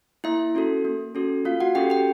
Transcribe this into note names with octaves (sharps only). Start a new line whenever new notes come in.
A#3 E4 E5
C#4 F#4 A4
A#3
C#4 F#4 A4
A#3 F4 F5
F#4 F#5
C#4 F#4 G4 A4 G5
G4 G5